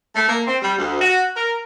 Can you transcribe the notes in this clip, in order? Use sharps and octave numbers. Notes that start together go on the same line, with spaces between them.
A3
A#3
C4
G3
D2
F#4
A#4